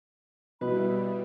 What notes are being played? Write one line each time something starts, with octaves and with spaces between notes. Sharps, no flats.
B2 G3 E4 B4 B5